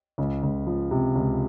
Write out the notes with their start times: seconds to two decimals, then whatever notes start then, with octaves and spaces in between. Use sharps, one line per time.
0.18 C#2
0.43 C#2
0.67 F3
0.91 C3
1.15 C#2